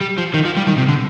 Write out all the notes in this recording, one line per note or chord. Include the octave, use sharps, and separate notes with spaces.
G3
F3
D#3
F3
G3
D#3
C3
D3